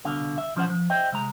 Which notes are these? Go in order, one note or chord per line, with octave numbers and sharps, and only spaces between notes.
C2 B2 D3 F5
E5
B2 F3 C#4 C5 F#5
F3
C5 D#5 E5 G5
C3 G#3 A#5